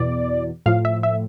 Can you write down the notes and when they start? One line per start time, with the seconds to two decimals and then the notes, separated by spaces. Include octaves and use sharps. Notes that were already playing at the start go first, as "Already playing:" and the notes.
Already playing: E2 B2 D5
0.66 A2 F3 F5
0.85 E5
1.03 E5